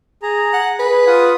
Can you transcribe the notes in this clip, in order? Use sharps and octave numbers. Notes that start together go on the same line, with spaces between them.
G#4 A#5
F#5
G#4 B4
F4 F#5 D#6